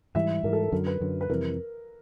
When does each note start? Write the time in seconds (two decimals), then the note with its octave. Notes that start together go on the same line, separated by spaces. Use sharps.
0.15 G#2 E3 G3 E5
0.43 G#2 E3 G3 A#4
0.53 A4
0.62 A#4
0.72 F#2 D3 F#3 A#4
0.86 B4
1.00 F#2 D3 F#3
1.21 B4
1.30 F2 C3 E3 G3 A#4